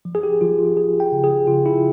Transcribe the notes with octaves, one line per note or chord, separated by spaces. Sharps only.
F3
G#4
G4
F3 F4
F4
F3 G#4
G5
C#3
G#4
C#3 F4
E4